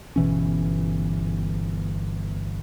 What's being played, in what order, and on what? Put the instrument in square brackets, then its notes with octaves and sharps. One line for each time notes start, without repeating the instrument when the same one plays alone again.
[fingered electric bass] G1 B2 E3 C#4